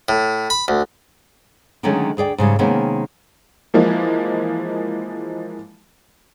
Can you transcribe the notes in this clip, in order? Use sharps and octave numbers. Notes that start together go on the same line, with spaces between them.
A2
B5
D2
D3 D#3 F#3 G#3 A3 C#4
D2 G#4 D5 G5
G#2 C#3 G3
C3 D#3 G#3 A#3 B3 C#4
E3 F3 G#3 A#3